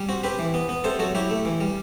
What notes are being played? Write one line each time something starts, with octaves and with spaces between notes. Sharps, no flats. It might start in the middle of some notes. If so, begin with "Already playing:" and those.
Already playing: G3
C4 F#4
C4 G4 B4
E3
B3
B3
C3 A4 C5
F#3 F#4 A4
F#3 E4 G4
A3
E3
G3